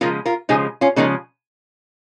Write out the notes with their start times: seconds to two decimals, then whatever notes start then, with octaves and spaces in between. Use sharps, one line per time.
0.01 C#3 F3 G#3 F4 A#4
0.26 F4 A#4
0.49 C#3 F3 G#3 D#4 G#4
0.81 C#4 F4
0.96 C#3 F3 G#3 A#3 D#4